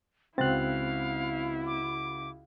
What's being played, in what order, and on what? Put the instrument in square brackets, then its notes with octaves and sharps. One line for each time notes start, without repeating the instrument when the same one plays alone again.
[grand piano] C#2 F#4 A6 [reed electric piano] C4 F#6 [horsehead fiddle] E4 [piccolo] F5
[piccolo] D6